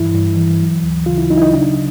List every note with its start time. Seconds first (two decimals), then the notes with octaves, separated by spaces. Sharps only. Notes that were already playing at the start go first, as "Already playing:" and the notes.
Already playing: G2 E3 E4
0.14 G2
0.36 E3
0.61 F#3
0.83 D2
1.06 C#3 F4
1.18 E4
1.30 F#3 D#4
1.38 E4
1.42 D#4
1.53 C#3 D4